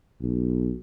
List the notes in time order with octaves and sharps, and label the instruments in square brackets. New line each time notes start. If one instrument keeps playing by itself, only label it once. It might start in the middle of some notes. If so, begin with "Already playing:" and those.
[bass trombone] B1